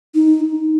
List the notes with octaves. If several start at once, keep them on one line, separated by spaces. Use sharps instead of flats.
D#4